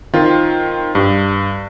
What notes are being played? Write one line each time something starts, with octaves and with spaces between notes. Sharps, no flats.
D#3 C4 F4
G2